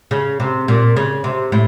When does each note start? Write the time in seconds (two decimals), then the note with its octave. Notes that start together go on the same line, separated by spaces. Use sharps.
0.11 C#3
0.40 C3
0.68 A#2
0.96 C#3
1.24 C3
1.52 A2